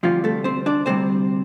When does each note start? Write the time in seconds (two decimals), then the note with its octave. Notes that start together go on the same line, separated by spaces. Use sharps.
0.03 D2 C3 F3 G3 F4
0.24 A3 A4
0.44 C4 C5
0.66 D4 D5
0.86 D2 C3 G3 C4 C5